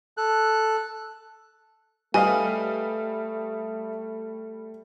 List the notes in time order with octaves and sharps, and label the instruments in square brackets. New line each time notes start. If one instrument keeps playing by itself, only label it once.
[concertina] A4 F#6
[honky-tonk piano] G3 [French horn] A3 [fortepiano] B4 D#5 F5 [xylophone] G#5